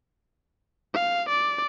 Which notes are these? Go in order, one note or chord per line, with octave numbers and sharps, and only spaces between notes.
F5
D5